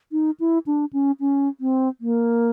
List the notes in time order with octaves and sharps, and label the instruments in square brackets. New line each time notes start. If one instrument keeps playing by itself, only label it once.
[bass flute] D#4
E4
D4
C#4
C#4
C4
A#3